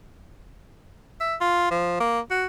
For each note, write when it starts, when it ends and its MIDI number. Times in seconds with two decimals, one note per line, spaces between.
1.20 1.35 76
1.41 1.70 65
1.71 1.96 53
2.00 2.20 58
2.31 2.46 66